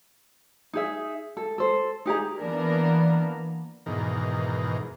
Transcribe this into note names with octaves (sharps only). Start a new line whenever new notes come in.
D#4 G#4 E5
A4
A4 C5
D#4 G4 G#4 A#5
E3 A#3 B3 D4 A#4
E2 G#2 B2 D#3 A#4